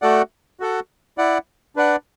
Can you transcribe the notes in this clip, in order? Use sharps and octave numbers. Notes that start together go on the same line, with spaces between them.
A3 F#4 A4 D5 F#5
F#4 A4 F#5
E4 D5 F#5
D4 B4 D5 F#5